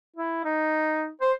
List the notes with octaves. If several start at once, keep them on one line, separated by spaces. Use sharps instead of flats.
E4
D#4
C5